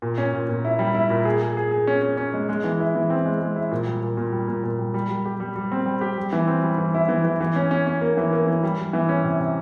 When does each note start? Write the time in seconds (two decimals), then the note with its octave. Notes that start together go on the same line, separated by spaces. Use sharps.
0.02 A#2
0.18 C#4
0.33 A#2
0.49 A#2
0.65 E4
0.79 G3
0.94 E4
1.10 A#2
1.25 G#4
1.41 G#4
1.57 G#4
1.71 G#4
1.87 C#4
2.02 C#4
2.17 C#4
2.34 G#3
2.49 G#3
2.64 E3
2.80 E4
2.95 E3
3.10 C4
3.26 G#3
3.41 G#3
3.56 E4
3.71 A#2
3.86 G3
4.02 A#2
4.17 A#2
4.32 G3
4.48 A#2
4.64 A#2
4.79 G3
4.94 G3
5.09 G3
5.25 G4
5.40 G3
5.56 G3
5.72 C4
5.86 G3
6.01 G4
6.18 G3
6.33 E3
6.48 C4
6.63 G3
6.78 E3
6.94 E4
7.09 E3
7.25 E3
7.41 E3
7.56 C#4
7.71 C#4
7.87 C#4
8.01 A#3
8.17 E3
8.33 A#3
8.47 E3
8.63 G3
8.79 G3
8.93 E3
9.09 C#4
9.24 C3
9.39 C3